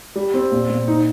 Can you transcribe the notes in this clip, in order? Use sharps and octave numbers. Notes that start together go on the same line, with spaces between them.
G3
C4
A#2
A#2
D#4